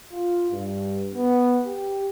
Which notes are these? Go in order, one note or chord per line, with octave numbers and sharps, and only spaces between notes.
F4
G2
B3
G4